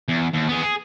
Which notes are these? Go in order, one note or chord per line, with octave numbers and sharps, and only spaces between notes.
E2
D#2
B3 G#4
G#4